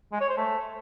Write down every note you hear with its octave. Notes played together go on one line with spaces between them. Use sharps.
G#3
C#5
C5
A3